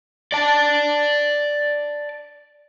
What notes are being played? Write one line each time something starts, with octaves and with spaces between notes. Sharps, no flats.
D5 A5